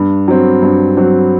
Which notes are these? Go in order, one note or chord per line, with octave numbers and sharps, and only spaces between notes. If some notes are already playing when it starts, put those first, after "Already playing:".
Already playing: G2
F#3 C4
G2
F#3 C4